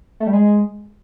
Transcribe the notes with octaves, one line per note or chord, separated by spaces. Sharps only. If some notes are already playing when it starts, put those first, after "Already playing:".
A3
G3
G#3